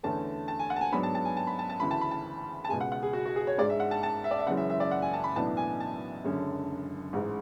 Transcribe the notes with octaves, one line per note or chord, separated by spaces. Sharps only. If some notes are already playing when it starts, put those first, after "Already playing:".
E2 D3 A3 C#4 A5
A5
G#5
F#5
A5
G#5
G#2 F#3 B3 D4 B5
A5
A5
G#5
A5
B5
A5
A5
D2 C#3 E3 B5
A5
B5
A5
A5
C#2 B2 G#3 G#5
F#5
F#5
G#4
F#4
F#4
G#4
C#5
G#2 G#3 D4 D5
E5
F#5
A5
A5
E5
D5
E5
F#1 F#2 E3 G#3 C#4 F#5
E5
E5
D5
F#5
G#5
A5
B5
B1 A2 E3 B3 D4 A5
G#5
A5
F#1 F#2 D3 G#3 C#4
A1 G#2 G#3